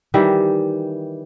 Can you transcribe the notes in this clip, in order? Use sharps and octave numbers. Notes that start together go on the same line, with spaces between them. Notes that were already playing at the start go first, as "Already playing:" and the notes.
D#3 E3 G3 E5